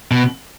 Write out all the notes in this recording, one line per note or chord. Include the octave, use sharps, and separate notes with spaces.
B2